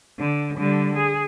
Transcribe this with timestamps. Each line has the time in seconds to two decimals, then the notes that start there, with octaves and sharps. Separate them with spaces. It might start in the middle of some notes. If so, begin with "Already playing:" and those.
0.19 D3
0.58 D3 G3
0.96 G#4